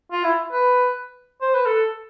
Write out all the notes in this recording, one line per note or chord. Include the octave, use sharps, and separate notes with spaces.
F4
E4
B4
C5
B4
A4